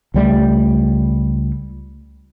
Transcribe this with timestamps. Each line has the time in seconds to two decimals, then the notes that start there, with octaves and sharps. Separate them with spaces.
0.14 C#2 G3 A3